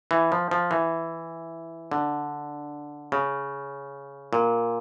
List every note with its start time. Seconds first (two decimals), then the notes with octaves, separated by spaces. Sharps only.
0.11 E3
0.32 F3
0.51 F3
0.71 E3
1.91 D3
3.12 C#3
4.33 A#2